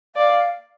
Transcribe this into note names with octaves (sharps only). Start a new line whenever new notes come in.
D5 F5